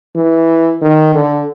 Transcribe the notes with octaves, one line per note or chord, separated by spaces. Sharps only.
E3
D#3
D3